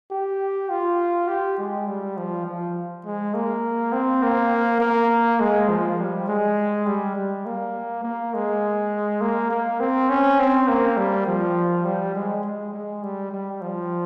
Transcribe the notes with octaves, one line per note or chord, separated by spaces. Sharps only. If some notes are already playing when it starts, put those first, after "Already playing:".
G4
F4
G4
G#3
G3
F3
F3
G#3
A#3
C4
A#3
A#3
G#3
F3
G3
G#3
G3
G3
A#3
A#3
G#3
A#3
A#3
C4
C#4
C4
A#3
G3
F3
G3
G#3
G#3
G#3
G3
G3
F3